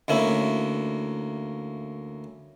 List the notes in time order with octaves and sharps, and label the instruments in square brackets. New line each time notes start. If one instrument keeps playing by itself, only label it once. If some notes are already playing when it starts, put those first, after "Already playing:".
[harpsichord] D2 A#3 C#4 E4